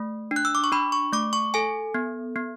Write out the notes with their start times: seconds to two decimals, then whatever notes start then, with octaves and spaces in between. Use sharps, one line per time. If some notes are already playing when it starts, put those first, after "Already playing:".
Already playing: A3
0.31 D4
0.36 F#6
0.45 E6
0.55 D6
0.64 C#6
0.72 D4 B5
0.92 C#6
1.13 A3 D6
1.33 C#6
1.54 A4 G#5
1.94 B3
2.36 B3